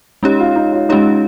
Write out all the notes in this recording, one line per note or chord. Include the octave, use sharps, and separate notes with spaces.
G#3 C#4 D#4 G4 C#5
F4
D#4
F4
G#3 C#4 D#4 G4 C#5